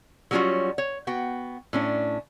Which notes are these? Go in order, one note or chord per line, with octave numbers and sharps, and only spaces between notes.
F#3 G3 C#4 D#4 F4 F#4
C#5
B3 F#4 G5
A2 C#4 D4